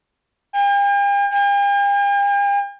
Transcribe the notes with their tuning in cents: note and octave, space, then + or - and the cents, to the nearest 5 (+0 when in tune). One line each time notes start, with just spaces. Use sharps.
G5 +45
G5 +45